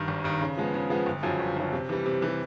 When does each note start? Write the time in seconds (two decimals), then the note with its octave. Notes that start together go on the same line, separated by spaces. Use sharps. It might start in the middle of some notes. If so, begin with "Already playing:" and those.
Already playing: G2 D#3
0.08 G#1
0.24 G2 D#3
0.41 C#3
0.57 F3 G#3 B3
0.74 C#3
0.90 F3 G#3 B3
1.06 G1
1.23 F#2 C#3 F3
1.40 G1
1.57 F#2 C#3 F3
1.73 C3
1.89 E3 G3
2.06 C3
2.22 E3 G3